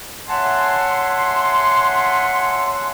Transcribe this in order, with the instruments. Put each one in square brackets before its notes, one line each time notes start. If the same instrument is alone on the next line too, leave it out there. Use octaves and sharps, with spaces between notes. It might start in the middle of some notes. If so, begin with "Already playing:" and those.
[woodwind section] C#5 E5 F#5 G#5 A5 C6